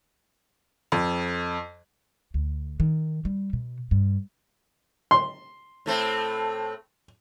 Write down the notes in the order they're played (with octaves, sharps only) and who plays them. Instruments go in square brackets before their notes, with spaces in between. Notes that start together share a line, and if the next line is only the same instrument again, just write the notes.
[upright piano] F2
[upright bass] D2
D#3
G3
B2
G2
[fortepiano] C6
[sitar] A2 A3 C4